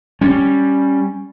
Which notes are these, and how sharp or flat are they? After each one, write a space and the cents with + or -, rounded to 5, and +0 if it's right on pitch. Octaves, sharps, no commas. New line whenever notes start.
G3 +0 C#4 +0